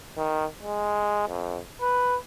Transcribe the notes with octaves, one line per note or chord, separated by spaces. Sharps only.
D#3
G#3
F2
B4